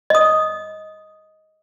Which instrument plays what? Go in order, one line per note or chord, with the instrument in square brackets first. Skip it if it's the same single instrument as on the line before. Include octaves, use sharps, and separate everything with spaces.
[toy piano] D#5 D#6